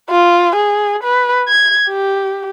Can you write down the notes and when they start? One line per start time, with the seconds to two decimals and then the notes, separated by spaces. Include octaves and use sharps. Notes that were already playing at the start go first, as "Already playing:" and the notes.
0.11 F4
0.56 G#4
1.04 B4
1.49 G#6
1.89 G4